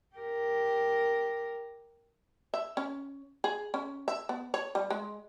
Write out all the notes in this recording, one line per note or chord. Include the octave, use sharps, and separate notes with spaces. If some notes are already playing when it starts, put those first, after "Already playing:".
G4 A#4
E5
C#4
G#4
C#4
E5
B3
C#5
G3
G#3